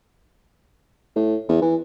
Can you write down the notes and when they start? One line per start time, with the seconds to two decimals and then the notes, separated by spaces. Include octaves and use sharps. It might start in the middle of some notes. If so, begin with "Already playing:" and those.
1.16 A2
1.49 E2
1.62 E3